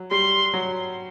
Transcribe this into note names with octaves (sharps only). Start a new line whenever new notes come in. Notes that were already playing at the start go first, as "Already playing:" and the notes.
Already playing: F#3
G3 C6
F#3